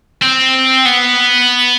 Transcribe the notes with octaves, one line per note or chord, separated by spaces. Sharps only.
C4
B3